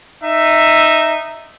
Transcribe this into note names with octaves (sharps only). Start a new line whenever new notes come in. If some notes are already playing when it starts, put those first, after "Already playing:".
D#4 E5